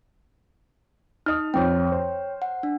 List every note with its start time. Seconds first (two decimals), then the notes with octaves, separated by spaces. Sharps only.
1.26 D#4 D#5 D#6 F6
1.54 F2 C4 C#5 G5
1.92 C5
2.42 F#5
2.63 D4